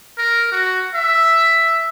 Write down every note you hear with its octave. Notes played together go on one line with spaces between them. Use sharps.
A#4
F#4
E5